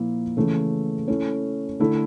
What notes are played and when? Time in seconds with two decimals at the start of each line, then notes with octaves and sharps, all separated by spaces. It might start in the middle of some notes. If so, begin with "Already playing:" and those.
Already playing: A#2 F3 A#3 E4
0.37 C#3 E3 A3
1.08 A3 C#4 E4 A4
1.80 D3 A3 E4 A4